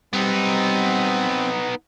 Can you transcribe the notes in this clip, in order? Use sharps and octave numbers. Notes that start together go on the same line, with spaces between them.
G3 B3 C4 D#4